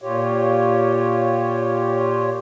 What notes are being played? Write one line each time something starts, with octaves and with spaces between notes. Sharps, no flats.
A#2 F4 G4 C#5